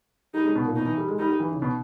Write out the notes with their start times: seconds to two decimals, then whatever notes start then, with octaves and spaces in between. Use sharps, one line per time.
0.34 G3 D#4
0.44 G#3
0.55 B2
0.65 A#2
0.76 B2 D#4
0.87 E3
0.97 G3
1.08 G#3
1.19 G3 D#4
1.30 G3
1.40 E3
1.51 C#3
1.62 B2